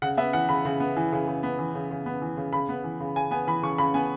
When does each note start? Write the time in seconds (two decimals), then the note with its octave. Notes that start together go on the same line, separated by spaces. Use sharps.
0.02 C#3 F#5
0.17 B3 E5
0.33 E3 F#5
0.49 C#3 B5
0.65 C#3
0.80 B3
0.96 E3
1.12 C#3
1.28 C#3
1.43 B3
1.59 E3
1.75 C#3
1.91 C#3
2.06 B3
2.22 E3
2.37 C#3
2.53 C#3 B5
2.69 B3
2.84 E3
3.00 C#3
3.16 C#3 G#5
3.31 B3 G#5
3.47 E3 B5
3.63 C#3 C#6
3.78 C#3 B5
3.94 B3 G#5